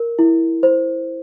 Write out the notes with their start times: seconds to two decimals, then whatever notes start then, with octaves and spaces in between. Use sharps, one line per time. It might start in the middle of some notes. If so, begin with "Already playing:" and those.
Already playing: A#4
0.19 E4
0.63 C5